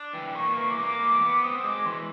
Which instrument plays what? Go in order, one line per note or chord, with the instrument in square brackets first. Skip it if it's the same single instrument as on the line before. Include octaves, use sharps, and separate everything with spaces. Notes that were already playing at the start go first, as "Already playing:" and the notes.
Already playing: [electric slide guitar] D4
[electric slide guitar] E3 [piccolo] G5
[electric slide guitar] A#3 [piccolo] C#6
[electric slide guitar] E3 [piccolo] C#6
[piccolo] D6
[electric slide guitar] A#3
[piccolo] D6
[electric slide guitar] E3
B3
[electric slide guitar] C4 [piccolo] D#6
[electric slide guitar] G#3 [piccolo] D6
[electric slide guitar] E3 [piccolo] C6